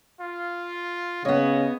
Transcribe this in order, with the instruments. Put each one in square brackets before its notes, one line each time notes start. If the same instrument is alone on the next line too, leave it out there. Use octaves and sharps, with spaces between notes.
[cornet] F4
[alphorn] C#3 [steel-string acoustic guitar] B3 C#5 [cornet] D#5